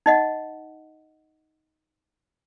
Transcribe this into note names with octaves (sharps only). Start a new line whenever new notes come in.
D#4 D#5 F#5